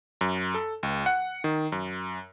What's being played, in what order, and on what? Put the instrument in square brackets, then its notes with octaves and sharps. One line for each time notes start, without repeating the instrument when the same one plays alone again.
[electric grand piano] F#2
A4
C#2
F#5
D#3
F#2